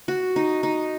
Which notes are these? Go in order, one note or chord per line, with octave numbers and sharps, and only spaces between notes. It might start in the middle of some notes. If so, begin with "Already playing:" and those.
F#4
D#4
D#4